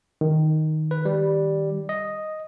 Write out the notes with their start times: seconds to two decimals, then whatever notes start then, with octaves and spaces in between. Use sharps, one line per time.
0.21 D#3
0.91 B4
1.05 G3
1.89 D#5